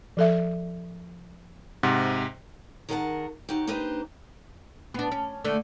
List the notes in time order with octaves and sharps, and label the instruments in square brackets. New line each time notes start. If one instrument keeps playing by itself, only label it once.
[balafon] F3 A4 E5
[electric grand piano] G#2 C3 F#5
[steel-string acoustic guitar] D#3 G#4 A#4 F5 F#5 A5
D#2 D#4 F#4 G4
A#3 D4 D#4 G4 B4 C5
[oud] B3 D4
C#4
D3 A3